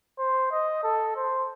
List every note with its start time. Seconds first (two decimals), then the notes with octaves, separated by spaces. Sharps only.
0.19 C5
0.51 D#5
0.84 A4
1.16 C5